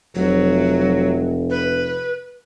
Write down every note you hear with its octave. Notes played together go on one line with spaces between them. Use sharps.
F1 F#3
B4